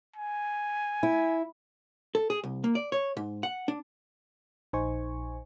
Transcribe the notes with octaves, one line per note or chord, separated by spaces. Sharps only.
G#5
E4
A4
G#4
C2
A#3
D5
C#5
G#2
F#5
D4
A#1 D#4 C5 G#5 C#6